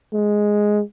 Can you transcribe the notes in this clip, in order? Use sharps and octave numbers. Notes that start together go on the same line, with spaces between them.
G#3